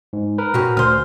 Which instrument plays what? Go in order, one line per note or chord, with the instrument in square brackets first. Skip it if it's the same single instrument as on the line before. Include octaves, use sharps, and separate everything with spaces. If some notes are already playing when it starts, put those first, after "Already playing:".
[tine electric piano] G#2
A#4 B4
[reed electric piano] A#2 F#4 [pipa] C4 C#4 G#4
[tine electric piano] D2 [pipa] G#4 C5 [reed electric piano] F6